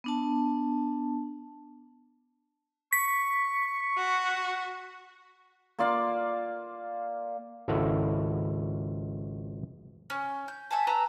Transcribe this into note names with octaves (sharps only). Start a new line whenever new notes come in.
B3 D4 A5
C#6 B6
F#4
A#3 F4 D5 F5
G#1 C#2 E4 A4 F5 F#5
C#4
G6
E5 F#5 G#5 A5
B4 A5 A#5 E6